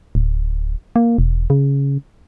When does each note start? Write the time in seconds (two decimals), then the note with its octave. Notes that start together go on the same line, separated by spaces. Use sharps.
0.15 D1
0.96 A#3
1.18 E1
1.50 C#3